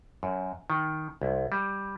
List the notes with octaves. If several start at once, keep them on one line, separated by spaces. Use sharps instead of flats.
F#2
D#3
C2
G3